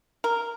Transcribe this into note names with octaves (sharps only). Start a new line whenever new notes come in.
A#4